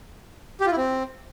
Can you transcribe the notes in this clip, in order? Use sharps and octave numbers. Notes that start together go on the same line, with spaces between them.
G4
F4
E4
C4